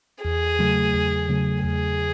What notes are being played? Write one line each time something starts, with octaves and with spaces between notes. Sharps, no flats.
E2 G#4
C#3 F#3 A3
E2
C#3 F#3 A3
E2 G#4